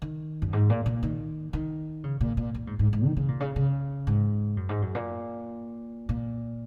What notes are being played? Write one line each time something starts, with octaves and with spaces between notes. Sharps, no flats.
D#3
F#2
G#2
A#2
A#2
D#3
D#3
C#3
A#2
A#2
A#2
G#2
G#2
G#2
D#3
C#3
A#2
C#3
C#3
G#2
F#2
G#2
F#2
A#2
A#2